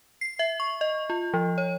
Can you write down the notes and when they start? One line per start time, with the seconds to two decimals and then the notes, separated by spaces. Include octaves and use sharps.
0.21 C7
0.39 E5
0.60 C#6
0.81 D#5
1.10 F4
1.34 F3
1.58 C#5